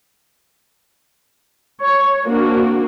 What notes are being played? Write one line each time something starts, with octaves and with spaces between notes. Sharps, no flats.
C#5
A#3 C4 D4 F#4